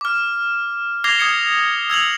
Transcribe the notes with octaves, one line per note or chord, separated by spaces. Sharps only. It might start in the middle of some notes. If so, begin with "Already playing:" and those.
D6 F6
D6 G#6 A#6 C7 F7 G7
D#6 G#6 C#7
E6 G#6 F7 F#7